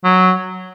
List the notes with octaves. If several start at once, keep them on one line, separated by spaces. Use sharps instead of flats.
F#3